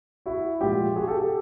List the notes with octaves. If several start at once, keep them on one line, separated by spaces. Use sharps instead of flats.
E4 F#4
A#2 F3 G#3 F4 G4
F#4 G#4
G4 A4
G4 A4